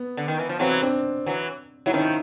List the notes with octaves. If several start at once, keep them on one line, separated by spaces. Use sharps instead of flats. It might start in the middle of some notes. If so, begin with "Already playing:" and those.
Already playing: B3
D3
D#3
E3
F3
E3 F#3 C4
C4 D4
E3 F#3
F#3 E4
D#3 F3 C#4 D#4